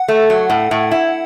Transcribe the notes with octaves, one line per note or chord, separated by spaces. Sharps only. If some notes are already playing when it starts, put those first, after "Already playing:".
Already playing: F#5
A3
F#3
A2
A2
E4